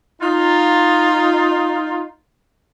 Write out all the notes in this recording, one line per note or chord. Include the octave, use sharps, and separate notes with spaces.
D#4 F4